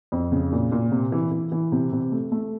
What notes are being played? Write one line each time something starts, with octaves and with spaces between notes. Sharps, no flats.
F2
C#3
A#2
A#2
C3
E3
E3
E3
C3
C3
A3
A3